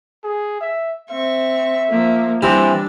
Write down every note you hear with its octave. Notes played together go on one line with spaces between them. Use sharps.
G#4
E5
C4 E5 C#6
F3 A#3
E3 G3 C4 D4